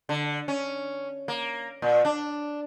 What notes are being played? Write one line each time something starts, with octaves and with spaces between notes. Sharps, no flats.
D3
C#4
A#3
A#2
D4